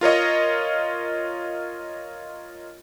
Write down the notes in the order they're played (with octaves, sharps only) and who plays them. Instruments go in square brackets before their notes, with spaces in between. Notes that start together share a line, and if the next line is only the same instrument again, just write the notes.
[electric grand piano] F4 A#4 C#5 D#5